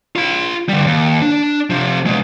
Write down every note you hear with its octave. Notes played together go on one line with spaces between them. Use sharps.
F4 B5
D3 G3
D#2
D4
C3 F3
B2 G#3